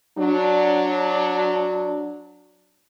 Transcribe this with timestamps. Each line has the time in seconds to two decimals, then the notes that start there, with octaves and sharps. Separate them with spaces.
0.18 F#3 D4